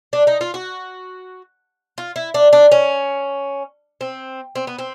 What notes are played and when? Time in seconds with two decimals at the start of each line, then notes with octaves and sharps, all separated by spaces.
0.13 D4
0.27 D#4
0.41 F4
0.54 F#4
1.98 F4
2.16 E4
2.34 D4
2.53 D4
2.72 C#4
4.01 C4
4.55 C4
4.67 B3
4.78 C4